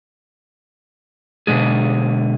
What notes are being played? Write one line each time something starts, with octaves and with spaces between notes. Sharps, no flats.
B2 D3 G#3 G#4